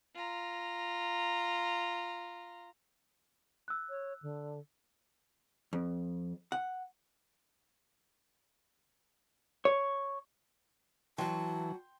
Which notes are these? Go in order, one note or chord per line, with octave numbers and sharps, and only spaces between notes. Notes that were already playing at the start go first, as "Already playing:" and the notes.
F4 A#5
E6 F#6
C#5
D3
F2
F#5
C#5
E3 F#3 F#4 G5 A5 C6